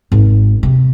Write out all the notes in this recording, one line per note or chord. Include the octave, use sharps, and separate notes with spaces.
G#1
C3